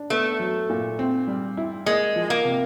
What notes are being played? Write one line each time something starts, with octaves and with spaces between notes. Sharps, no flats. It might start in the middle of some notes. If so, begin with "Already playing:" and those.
Already playing: D4
A3 B3
F#3
A#2
C4
G3
E4
G#3 A#3
F3
A#3
C3